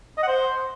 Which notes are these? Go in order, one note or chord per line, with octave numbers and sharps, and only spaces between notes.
D#5
F#5
C5